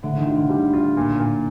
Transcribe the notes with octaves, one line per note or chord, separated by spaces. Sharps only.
A2 D3
D#3
F4
D3
G3
F4
A#2
A#2